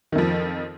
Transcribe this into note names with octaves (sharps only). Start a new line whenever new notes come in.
F2 D#3 F3